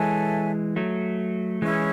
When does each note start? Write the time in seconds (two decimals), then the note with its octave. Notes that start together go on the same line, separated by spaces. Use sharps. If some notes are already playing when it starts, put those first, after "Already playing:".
Already playing: E3 G#3 A4 C#5 E5 G#5
0.76 F#3 A3
1.62 E3 G#3 C#4 E4 G#4 C#5